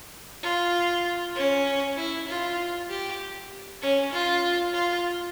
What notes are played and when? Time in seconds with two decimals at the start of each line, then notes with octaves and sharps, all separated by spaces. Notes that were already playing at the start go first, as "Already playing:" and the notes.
0.43 F4
1.35 C#4
1.96 E4
2.28 F4
2.89 G4
3.82 C#4
4.13 F4
4.73 F4